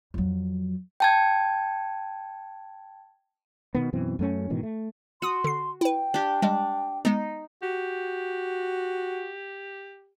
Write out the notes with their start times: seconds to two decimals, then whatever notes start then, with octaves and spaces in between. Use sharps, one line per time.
0.14 F2 F#3
1.00 G5 A5 G#6
3.75 B2 D#3 B3
3.93 F#2 B2 E3 C4
4.19 F#2 A3 C#4
4.50 G#2 B2 D#3 E3
4.63 A3
5.22 F#4 C6 D#6 D#7
5.44 D3 C7
5.81 E4 B4 G5
6.14 D4 G4
6.42 G3 G#3 D4
7.05 G#3 B3 D#4
7.62 F#4 G4